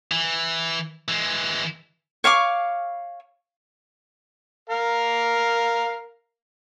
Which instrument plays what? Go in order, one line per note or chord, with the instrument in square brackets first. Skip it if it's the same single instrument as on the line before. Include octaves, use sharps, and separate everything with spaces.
[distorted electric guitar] E3
E3 G#3
[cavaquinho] C#5 F5 C#6 D6
[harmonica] A#4 F5